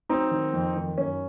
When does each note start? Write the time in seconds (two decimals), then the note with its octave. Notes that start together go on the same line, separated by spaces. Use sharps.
0.09 F#3 C4 D#4
0.31 D#3
0.53 F2
0.76 D#3
0.98 F#2 C#4